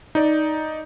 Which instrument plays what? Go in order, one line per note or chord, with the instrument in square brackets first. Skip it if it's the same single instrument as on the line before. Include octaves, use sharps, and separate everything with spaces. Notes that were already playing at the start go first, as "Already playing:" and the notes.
[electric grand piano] D#4 D5